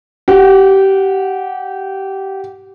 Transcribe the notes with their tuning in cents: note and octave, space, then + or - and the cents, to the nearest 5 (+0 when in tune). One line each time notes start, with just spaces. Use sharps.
G4 -20 F#5 -5